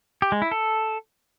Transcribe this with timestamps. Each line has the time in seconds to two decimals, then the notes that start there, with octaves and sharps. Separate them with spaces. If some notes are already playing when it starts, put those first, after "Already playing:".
0.22 G4
0.32 G#3
0.42 E4
0.51 A4